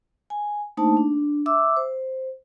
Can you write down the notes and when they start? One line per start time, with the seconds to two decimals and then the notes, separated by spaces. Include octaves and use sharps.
0.30 G#5
0.77 A3 A#3 D4 D#4 C5 A5
0.97 D4
1.46 E5 D6 E6
1.77 C5